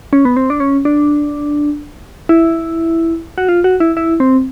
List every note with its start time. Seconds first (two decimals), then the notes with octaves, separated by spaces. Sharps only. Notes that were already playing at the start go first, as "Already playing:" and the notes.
0.13 C#4
0.25 B3
0.37 C4
0.50 D4
0.60 C#4
0.85 D4
2.29 E4
3.38 F#4
3.49 F4
3.64 F#4
3.80 E4
3.97 E4
4.20 C4